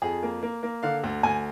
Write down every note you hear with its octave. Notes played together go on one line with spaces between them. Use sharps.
F2 G#4
A#3
A#3
A#3
D3 F5
D2
D2 G#5